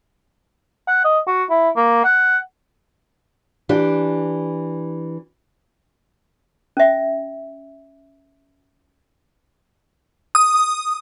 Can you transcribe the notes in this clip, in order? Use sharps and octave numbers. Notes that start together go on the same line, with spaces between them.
F#5
D#5
F#4
E4
A#3
F#5
E3 D4 G4
C#4 E5
D#6